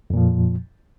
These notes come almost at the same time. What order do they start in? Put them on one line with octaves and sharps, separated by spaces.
F2 A#2 F3